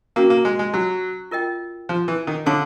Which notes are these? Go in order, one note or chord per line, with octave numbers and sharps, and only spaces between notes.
A#3 C#4 F#4 A#4
A#3
G#3
G#3
F#3
F4 A#4 D#5 G5
F3
E3
D#3
D3 A4 C#5 F5 A5 C#6